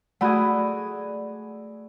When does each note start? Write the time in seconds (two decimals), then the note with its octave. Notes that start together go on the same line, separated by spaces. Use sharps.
0.21 A3 F#4 G#4 D5 F#5 B5